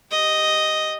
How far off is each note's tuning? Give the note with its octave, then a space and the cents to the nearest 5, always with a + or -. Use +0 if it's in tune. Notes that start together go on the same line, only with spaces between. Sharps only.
G4 +0 D#5 +0